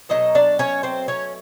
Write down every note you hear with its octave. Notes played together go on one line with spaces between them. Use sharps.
B2 F#3 A3 D#4 D#5
D4 D5
C#4 C#5
C4 C5
C#4 C#5